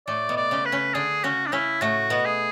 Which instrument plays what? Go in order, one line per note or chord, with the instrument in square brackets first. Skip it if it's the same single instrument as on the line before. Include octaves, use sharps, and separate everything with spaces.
[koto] A2 A3 [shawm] D5
[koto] B2 B3
[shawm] D5
[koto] C#3 C#4
[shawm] B4
[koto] C#3 C#4
[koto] D3 D4 [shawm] G#4
[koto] C#3 C#4 [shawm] F#4
[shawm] D4
[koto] C#3 C#4 [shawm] E4
[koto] A2 A3 [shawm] F#4
[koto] B2 B3
[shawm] G#4